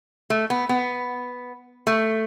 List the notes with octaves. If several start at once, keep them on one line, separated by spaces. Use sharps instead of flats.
A3
B3
B3
A3